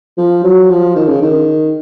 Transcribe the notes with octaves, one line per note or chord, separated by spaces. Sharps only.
F3
F#3
F3
D#3
C#3
D#3